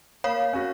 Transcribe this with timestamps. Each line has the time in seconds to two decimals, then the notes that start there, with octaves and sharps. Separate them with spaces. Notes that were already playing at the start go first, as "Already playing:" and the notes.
0.24 A#3 C#5 F5
0.53 C#4 F#4